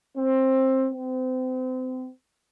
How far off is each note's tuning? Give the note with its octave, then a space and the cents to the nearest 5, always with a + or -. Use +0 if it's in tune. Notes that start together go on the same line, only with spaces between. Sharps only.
C4 +15
C4 -30